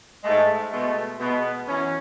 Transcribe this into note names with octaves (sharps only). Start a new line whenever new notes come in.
G#2 G#3 A3
B2 G#3 A3
B2 G#3 B3
F#2 E3 C#4